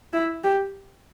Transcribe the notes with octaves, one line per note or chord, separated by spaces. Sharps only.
E4
G4